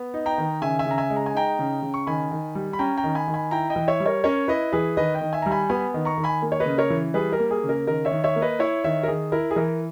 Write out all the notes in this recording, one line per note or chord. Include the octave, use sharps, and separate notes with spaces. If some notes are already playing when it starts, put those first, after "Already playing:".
Already playing: B3
D#4
G5 A#5
D#3
C#3 E5 G#5
E5 G#5
C#3
A#5
E5 G#5
G#3
A#5
G#5
D#4 G5 A#5
C#3
C#3
C#6
D#3 G#5 B5
D#3
G3
B5
C#4 G5 A#5
G5 A#5
D#3
G#5 B5
D#3
G#5 B5
E4 G5 A#5
D#5 G5
E3
C#5 E5
G3
A#4 C#5
C#4 A#4 C#5
E4 B4 D#5
E3 G#4 B4
D#3 B4 D#5
D#5 G5
D#3
E5 G#5
G3 A#5
G#5 B5
B3 G#5 B5
D#3
A#5 C#6
D#3
G#5 B5
A#3
C#5
B4 D#5
C#3
A#4 C#5
E3
G3 G#4 B4
A#4
A#3
G#4
C#3
A#4
D#3 A#4
C#5 E5
D#3
C#5 E5
A#3
B4 D#5
E4 C#5 E5
D#3 C#5 E5
A#4
D#3 G#4
E4 A#4
G#4
E3 A#4